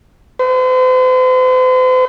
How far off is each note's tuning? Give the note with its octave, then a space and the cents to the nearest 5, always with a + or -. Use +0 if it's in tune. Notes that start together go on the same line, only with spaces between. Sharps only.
C5 -45